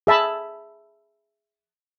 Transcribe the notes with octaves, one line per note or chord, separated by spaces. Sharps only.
G#4 E5 A5 B5